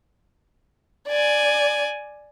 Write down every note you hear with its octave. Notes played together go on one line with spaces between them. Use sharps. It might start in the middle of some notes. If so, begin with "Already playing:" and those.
D5 G#5